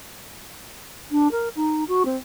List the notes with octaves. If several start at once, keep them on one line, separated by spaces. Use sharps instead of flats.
D4
A#4
D#4
F#4
C4